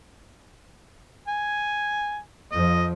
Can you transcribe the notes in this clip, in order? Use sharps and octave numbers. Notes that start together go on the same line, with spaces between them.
G#5
F2 F3 D#5